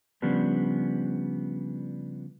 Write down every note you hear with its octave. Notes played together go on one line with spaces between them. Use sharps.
C#3 F3 G3 B3 D4